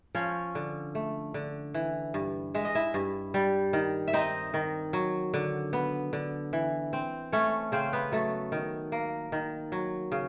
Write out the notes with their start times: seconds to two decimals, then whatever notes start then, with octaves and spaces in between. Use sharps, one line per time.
0.15 F3 C#4 C#5
0.55 D3
0.95 A3
1.34 D3
1.74 E3
2.14 G2
2.54 G#3 E5
2.65 D#5
2.75 E4 E5
2.94 G2
3.34 G3
3.73 D#3
4.08 E5
4.13 C4 D#4 D#5
4.54 D#3
4.93 F#3
5.34 D3
5.73 B3
6.13 D3
6.53 E3
6.93 C4
7.32 A3 C#4 C#5
7.72 C#3 C4 C5
7.93 B3 B4
8.12 F#3 A3 A4
8.52 D#3
8.92 A#3
9.32 D#3
9.72 F#3
10.12 C#3